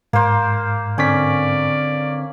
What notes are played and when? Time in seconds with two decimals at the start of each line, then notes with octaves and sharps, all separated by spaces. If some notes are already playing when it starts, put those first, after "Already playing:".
0.13 G#2 A#3 C5
0.98 D3 C4 C#4 D5 B6